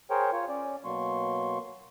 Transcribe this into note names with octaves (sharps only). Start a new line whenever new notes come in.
G#4 A#4 C5 C#5 G5
F4 C#5
C#4 D5
B2 F#3 A#3 C6 C#6